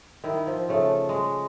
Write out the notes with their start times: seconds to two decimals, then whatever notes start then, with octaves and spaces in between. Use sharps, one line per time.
0.24 D#3 E4
0.47 F3
0.69 C#3 A3
1.09 G#3